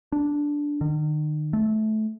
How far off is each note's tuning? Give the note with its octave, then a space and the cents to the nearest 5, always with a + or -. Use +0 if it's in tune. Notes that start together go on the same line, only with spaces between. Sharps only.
D4 -5
D#3 -40
A3 -20